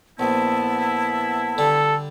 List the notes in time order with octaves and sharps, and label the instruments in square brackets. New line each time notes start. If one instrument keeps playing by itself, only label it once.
[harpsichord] A#1 [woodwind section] B3 E4 [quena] A5
[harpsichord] D3 G3 [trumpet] A4